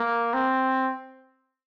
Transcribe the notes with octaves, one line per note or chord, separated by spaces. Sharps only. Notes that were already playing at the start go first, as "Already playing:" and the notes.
Already playing: A#3
C4